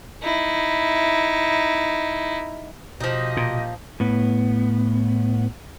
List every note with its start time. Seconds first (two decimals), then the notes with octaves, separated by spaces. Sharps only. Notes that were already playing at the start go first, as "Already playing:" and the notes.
0.22 D#4 E4
3.00 B2 F3 D#4 G4 D#5
3.37 A#2
4.00 A2 B3